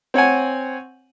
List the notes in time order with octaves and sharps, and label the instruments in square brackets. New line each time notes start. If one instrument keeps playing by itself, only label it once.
[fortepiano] C4 C#5 F#5 G#5